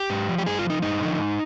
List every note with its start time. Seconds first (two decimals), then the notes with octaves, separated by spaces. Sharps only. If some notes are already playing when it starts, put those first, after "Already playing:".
Already playing: G4
0.10 G#2
0.28 F3
0.38 G4
0.46 G2 G#4
0.59 F4
0.64 F3
0.70 D#4
0.82 G2 D#4
1.01 D3 F3
1.19 G#2